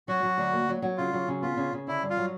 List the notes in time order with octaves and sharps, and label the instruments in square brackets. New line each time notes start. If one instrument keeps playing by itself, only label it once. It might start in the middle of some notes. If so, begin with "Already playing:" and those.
[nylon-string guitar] F#3 [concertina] F#4
[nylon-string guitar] F#3
D2
A#3
F#3
F#3
[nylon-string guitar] C#3 [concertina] F4
[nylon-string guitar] F#3
C#3
[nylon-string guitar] B3 [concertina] F4
[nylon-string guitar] C#3
C#3
[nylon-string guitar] D3 [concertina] E4
[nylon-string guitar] G2
[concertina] F4
[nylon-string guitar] F#3